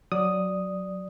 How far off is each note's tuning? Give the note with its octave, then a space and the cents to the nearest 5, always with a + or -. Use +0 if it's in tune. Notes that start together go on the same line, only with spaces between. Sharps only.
F#3 +0 D5 +0 D#6 +0